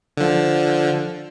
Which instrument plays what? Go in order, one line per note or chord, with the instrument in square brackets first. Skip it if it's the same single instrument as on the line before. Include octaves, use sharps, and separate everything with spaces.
[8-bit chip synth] D3 F3